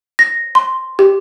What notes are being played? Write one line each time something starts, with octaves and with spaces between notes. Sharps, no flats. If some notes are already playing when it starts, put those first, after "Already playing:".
A#6
C6
G4